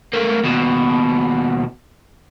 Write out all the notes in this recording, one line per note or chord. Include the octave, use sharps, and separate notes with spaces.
A3 A#3
D#2 B2